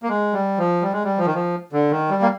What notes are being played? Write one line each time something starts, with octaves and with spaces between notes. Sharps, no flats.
A#3
G#3
G3
F3
G3
G#3
G3
F3
D#3
F3
D3
D#3
G3
A#3